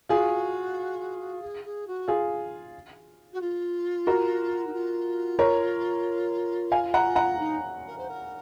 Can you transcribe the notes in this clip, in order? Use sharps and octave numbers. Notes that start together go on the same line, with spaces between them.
F4 F#4 G#4
G#4
G#4
F#4
F4 G#4
F#4
F4
F#4 A#4
D#4
F4
A#4 C#5
F5 G#5
F#5 A#5
F#5 A#5
D#4
A#4
C5
A#4